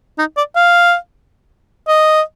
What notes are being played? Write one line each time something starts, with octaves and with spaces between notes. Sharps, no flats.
D#4
D5
F5
D#5